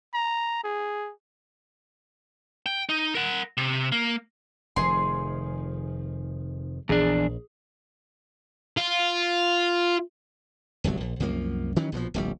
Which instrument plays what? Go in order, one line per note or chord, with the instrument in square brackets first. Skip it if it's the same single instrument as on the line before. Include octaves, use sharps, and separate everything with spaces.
[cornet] A#5
G#4
[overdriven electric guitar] G5
D#4
A#4 F#5
C3
A#3
[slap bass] F1 D#3 F3 [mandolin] G#4 C6
[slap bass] A#1 [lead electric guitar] E2 D4 [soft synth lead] G#4
[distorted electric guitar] F4
[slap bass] D1 G1 C2 F#3
A#1
C2 F#2 F3 A#3
D#3 E3 F#3 C#4
A#1 B2 E3 F3
D1 A#1 G3